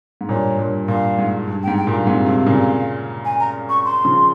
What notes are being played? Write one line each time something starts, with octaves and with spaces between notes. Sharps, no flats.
G#2
G2 A#2 C#5
G2 A#2
G2 A#2 F5
G#2
G2
G#2 G5
G5
G2 A#2 F5
G#2 C3
G#2 C3
A#2 C#3
G#5
A#5
C#6
C6
C#3 F3